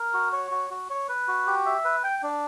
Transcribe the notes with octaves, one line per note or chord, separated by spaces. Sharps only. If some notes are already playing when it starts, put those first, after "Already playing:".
Already playing: A#4
F#4
C#5
F#4
F#4
C#5
B4
F#4
G4
E5
B4
G5
D4